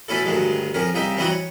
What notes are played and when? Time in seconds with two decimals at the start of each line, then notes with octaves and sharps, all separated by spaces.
0.08 B2 A3 C#4 E4 A4
0.25 D2 G2 D#3 F#3 G#3
0.74 F2 D#3 C#4 A#4
0.95 C2 C#3 D#4 E5 G5
1.17 E3 G3 C4 D#4 E4 F#4
1.30 C#5